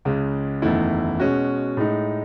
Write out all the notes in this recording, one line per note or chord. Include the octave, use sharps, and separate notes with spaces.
C#2 C#3 G#3
F#1 E2 D#3 A3 E4
B2 G#3 C#4 F#4
A2 G#3 D#4